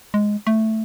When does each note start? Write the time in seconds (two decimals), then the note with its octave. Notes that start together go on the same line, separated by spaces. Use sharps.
0.14 G#3
0.47 A3